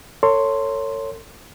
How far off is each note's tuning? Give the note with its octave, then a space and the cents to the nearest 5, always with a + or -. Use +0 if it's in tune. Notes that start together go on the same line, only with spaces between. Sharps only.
A4 +40 C#5 +0 C6 +0